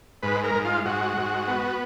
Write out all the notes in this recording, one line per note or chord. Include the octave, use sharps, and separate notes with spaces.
G#2 B4
A#4
G#2
F4
G#2 F#4
G#2
B3